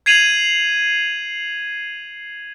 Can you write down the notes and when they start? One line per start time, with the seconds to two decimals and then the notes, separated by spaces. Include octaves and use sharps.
0.06 G#6 C7 D#7 F7 F#7